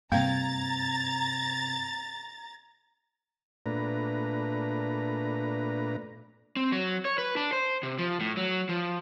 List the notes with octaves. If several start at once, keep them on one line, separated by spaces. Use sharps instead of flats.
G2 C3 A#3 C4 F5 A#5 G#6 A6
A#2 A3 D4 B4 A#5
C4
F#3
C#5
B4
D4
C5
C3
F3
A2
F#3
F3